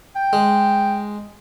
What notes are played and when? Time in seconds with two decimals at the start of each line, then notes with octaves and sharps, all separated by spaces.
0.16 G5
0.33 G#3